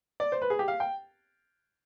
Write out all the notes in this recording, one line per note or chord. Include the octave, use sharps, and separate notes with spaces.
D5
C5
B4
G#4
G4
F5
G5